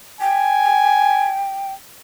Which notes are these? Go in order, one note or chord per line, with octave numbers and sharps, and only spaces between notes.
G5 G#5